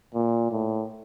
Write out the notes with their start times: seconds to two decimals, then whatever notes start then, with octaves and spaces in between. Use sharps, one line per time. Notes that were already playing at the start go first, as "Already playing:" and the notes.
0.14 A#2
0.52 A2